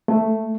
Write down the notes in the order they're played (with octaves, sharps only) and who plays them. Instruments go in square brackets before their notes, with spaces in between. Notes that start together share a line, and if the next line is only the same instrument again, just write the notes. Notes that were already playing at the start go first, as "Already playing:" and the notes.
[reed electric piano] A3